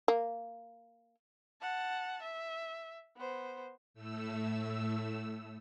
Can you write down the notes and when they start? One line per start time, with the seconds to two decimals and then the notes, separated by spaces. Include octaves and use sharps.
0.08 A#3
1.62 F#5 A5
2.22 E5
3.17 B3 C5
3.94 A2 A3 E6